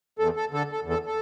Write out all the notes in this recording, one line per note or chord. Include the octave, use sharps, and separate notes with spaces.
E2 A4
A4
D3 A4
A4
E2
A4
A4